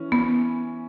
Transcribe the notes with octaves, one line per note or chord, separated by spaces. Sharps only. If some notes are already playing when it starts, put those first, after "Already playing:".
Already playing: E3 C#4
B3